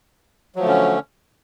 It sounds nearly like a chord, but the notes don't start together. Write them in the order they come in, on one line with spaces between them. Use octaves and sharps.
F#3 F3 A3 D3 C#4